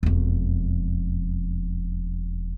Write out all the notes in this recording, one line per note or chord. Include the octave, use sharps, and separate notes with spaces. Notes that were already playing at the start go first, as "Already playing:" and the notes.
E1 F2